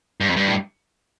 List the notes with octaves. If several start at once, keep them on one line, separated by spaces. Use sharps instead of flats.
G2
F2
G2
A2